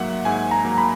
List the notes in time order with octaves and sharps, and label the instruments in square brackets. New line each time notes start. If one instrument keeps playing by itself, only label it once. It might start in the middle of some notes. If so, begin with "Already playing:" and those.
Already playing: [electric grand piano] G#2 F#3 A#3 E5 F#5
G#2 G#5
A#5
F#3 A#3
B5